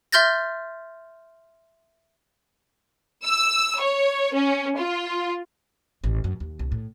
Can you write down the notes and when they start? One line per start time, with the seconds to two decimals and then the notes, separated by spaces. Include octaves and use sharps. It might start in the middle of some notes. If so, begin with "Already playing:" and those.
0.12 E5 C6 F6 G6 A6 A#6
3.23 E6
3.80 C#5
4.33 C#4
4.77 F4
6.04 A1
6.24 F#2
6.40 D#2
6.59 C2
6.72 A2